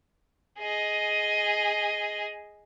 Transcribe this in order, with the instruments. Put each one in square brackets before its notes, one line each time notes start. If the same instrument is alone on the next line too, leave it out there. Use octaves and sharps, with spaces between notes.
[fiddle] G#4 D#5